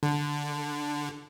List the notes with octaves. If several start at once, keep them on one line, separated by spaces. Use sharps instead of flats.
D3